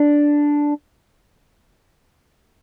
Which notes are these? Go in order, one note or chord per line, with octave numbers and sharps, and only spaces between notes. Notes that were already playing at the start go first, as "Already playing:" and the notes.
Already playing: D4